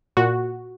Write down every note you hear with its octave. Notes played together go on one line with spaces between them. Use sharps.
A#2 F#4